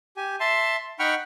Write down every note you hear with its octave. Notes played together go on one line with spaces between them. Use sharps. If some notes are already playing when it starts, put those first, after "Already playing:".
G4 G#5
E5 A5 C6
D#4 F#5 G5 B5 C#6 F6